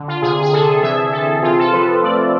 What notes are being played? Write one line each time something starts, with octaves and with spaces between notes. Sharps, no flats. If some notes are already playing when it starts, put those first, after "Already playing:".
Already playing: D3
F4
C3 G#4
G#4
C3 A4
E3 E5
C3 A4
C4 F4
A4
F3 B4
A3 D5